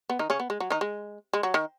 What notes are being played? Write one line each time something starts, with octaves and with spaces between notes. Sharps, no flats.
B3
D#3 D#4
C#3 C#4
B3
G#3
F#3
D#3 D#4
G#3
G#3
F#3
D#3